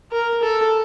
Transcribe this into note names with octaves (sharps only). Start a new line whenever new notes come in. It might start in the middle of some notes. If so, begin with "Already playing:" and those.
A#4
A4